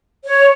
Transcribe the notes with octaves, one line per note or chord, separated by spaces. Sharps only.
C#5